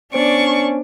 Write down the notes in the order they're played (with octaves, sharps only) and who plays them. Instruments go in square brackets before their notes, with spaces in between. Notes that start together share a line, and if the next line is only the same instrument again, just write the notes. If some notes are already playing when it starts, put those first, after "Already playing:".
[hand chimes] B3 C5 D7 [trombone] C#4 [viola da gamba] D4 [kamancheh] D5 C#6